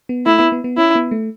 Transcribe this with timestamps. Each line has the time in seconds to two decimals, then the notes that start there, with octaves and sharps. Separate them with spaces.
0.09 B3
0.26 A3 E4
0.39 B3
0.52 B3
0.64 B3
0.77 C#4 E4
0.95 B3
1.11 A3